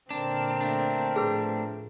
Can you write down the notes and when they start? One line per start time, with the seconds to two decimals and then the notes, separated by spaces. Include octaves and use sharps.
0.11 A#2 D3 C4 D4 A#4
0.61 A3 D4
1.16 A2 F3 G#4 B4